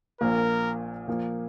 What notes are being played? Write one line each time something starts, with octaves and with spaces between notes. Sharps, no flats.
A#1 A#2 F3 A#3 A#4
A#2 F3 A#3